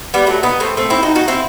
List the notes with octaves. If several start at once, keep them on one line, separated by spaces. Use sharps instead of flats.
G3 B3
F#3 A3
B3 D#4
A3 C4
A3 C4
C4 E4
D#4 F#4
D#4 F#4
C4 E4